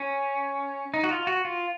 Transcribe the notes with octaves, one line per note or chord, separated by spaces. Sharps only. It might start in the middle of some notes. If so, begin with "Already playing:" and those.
Already playing: C#4
D#4
F#4
F4
F#4
F4